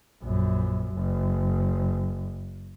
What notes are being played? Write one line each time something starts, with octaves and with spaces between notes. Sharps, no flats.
A#1 F#2
F#1